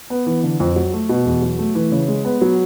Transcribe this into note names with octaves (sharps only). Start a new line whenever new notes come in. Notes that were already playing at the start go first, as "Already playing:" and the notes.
B3
E3
D3
F2
F#3
A3
B2
E2
F#3
A3
E3
C#3
G#3
B3
F#3